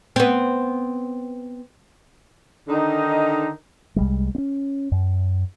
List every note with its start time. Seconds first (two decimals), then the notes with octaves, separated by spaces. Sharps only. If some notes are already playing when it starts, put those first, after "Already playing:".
0.16 B3 C4
2.68 D3 D#3 D#4
3.96 C2 G3 G#3
4.35 C4 C#4
4.92 F#2